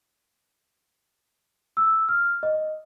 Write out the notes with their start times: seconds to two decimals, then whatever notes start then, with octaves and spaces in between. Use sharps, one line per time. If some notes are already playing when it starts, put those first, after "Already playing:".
1.77 E6
2.09 F6
2.43 D#5